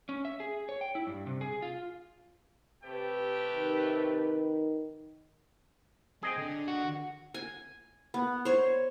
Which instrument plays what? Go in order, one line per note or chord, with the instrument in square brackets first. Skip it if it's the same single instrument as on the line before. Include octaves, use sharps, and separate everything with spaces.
[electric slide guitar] C#4
E5
G#4
C#5
G5
E4
G2
C3
G#4
F4
[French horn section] C3 B4 [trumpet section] A3 G4 G5
[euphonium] D#3
[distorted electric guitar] C4 [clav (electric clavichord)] G#4 D#5 G5
[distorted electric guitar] D3
[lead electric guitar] F#4
[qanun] G#5
B3
C5 C#5